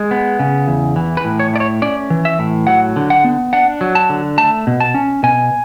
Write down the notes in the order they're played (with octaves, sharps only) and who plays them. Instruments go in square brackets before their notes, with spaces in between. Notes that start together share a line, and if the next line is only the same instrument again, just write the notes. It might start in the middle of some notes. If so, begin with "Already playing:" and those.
Already playing: [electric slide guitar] G#3
B3
C#3
E2
E3
B4
A2
C#5
A3 D5
C#5
C#4 D5
E3
E5
A2
F#3 F#5
D3
F#5
B3
D4 F#5
F#3
A5
D3
A3 A5
B2
A5
C#4
B2 G#5